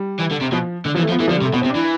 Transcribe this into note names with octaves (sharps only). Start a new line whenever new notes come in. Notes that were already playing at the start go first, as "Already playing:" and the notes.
Already playing: G3
E3
D3
C3
B2 F3
D3
F3
E3
A3
F3
B3
E3 A3
F3
D3
G3
C3
A3
B2 B3
C4
C3
D4
E3